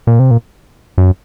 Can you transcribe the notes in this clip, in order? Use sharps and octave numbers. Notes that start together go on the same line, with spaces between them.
A#2
C3
A#2
F#2